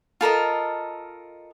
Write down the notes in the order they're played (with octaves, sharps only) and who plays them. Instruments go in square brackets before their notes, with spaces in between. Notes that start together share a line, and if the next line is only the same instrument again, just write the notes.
[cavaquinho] F4 A4 A#4 D#5